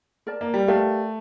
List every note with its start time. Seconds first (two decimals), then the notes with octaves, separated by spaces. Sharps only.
0.27 A#4 D5 A5
0.41 A#3
0.54 G3
0.68 A3 G4 A#4 D5 F5